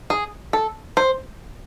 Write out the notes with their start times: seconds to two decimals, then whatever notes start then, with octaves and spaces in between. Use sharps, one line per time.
0.10 G#4
0.53 A4
0.97 C5